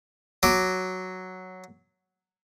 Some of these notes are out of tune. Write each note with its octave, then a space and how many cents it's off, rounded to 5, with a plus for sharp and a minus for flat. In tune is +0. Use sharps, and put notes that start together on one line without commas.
F#3 +0 D6 +0